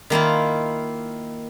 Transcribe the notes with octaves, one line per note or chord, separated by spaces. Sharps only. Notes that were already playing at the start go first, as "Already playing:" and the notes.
D#3 A#3 E4 F4